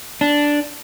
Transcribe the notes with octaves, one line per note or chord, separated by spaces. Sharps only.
D4